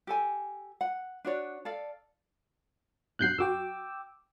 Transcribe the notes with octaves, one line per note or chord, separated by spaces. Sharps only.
G4 A4 G#5
F#5
D4 F#4 C#5 D5
A4 D5 F5
B1 G2 F#3 F#6 G6 C7
F#2 F#4 G5 D6 E6